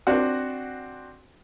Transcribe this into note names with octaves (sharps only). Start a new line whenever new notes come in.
C4 D4 F#4 F#5